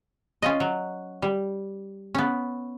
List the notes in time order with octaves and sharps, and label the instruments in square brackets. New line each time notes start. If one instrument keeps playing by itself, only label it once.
[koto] C#4 F4 D#5
F#3
G3
B3 C#4